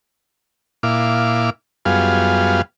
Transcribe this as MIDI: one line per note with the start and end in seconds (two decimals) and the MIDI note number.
0.83 1.50 46
0.83 1.50 64
0.83 1.50 77
0.83 1.50 86
1.85 2.62 42
1.85 2.62 55
1.85 2.62 59
1.85 2.62 65
1.85 2.62 68
1.85 2.62 77